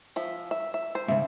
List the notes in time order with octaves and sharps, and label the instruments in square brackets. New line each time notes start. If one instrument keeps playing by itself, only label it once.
[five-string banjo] F3 E5
E5
E5
C5
[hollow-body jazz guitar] G#2 C#3 [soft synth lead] E5